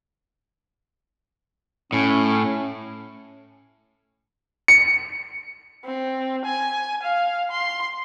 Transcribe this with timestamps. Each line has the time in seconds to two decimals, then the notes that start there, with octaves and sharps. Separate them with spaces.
1.93 A2 C#4
4.68 C#7
5.84 C4
6.45 G#5
7.02 F5
7.51 C6